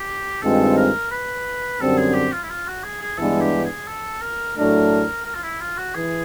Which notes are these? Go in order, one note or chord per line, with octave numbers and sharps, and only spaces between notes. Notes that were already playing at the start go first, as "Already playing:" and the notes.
Already playing: G4
G2 D#3 G#3 C4 F4 A4
A#4
B4
F#2 D3 G3 C4 A4
G#4
G4
F4
E4
F4
F#4
G#4
G#4
G2 E3 G#3 B3 D4 A4
G4
G#4
A4
A#4
A2 F#3 A3 D4 A#4
A#4
F4
E4
F4
F#4
E3 G#4